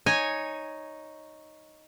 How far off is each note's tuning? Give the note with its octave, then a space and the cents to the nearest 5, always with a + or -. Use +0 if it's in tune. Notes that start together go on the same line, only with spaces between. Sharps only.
D#4 +0 C#5 +0 G#5 +0